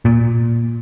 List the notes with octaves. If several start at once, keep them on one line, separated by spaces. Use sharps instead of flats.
A#2